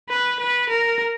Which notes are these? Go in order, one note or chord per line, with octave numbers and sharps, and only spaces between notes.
B4
B4
A#4